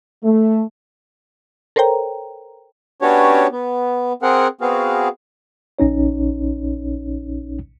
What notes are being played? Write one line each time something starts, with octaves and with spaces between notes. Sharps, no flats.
A3
A4 A#4 C5 C#5 G5 A#5
B3 C#4 D4 F#4 G4 C#5
B3
C4 G#4 A#4 F#5
B3 C4 F#4 G#4 F5
A#1 C#4 D#4 C#5